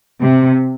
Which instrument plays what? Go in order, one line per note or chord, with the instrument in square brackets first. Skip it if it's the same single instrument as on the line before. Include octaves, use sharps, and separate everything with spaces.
[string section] C3